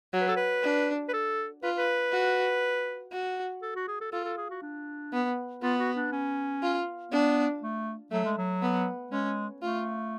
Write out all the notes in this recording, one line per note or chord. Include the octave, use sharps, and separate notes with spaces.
F#3
B4
A4
B4
D4
B4
A4
F4 B4
B4
F#4
F#4
A4
F#4
G#4
A4
F4 A4
A4
G#4
F#4
D4
B3
B3 F4
F#4
D4
C#4
F4
B3 D4
A3
F#3 A3
G#3
F#3
B3
G#3 C#4
A3 F4